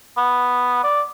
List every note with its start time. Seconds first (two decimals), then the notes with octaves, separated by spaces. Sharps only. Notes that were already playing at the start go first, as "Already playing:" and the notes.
0.17 B3
0.83 D5